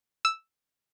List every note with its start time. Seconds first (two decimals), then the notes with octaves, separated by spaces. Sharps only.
0.25 E6